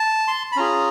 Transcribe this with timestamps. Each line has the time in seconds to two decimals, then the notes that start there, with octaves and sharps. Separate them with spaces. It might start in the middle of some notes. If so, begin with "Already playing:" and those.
Already playing: A5
0.28 C6
0.52 B5
0.57 C#4 F4 G#4 A#5